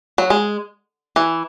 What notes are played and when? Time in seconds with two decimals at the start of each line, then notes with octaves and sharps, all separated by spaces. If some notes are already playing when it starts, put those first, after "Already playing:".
0.18 F#3
0.30 G#3
1.16 E3